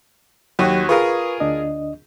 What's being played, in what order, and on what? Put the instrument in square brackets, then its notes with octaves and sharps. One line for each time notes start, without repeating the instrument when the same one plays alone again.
[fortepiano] D#2 F#4 [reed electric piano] F#3 G4
[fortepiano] F4 G#4 A#4 [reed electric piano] B4 C#6
[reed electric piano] D2 D4 D#5